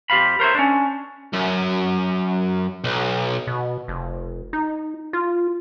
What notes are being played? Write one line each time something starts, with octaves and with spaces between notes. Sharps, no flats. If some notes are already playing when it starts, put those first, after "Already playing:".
F2 G4 C5 F5 B5
A#4 C5 C#5 E5
C#4 D4
F#2
B1
B2
F1
D#4
F4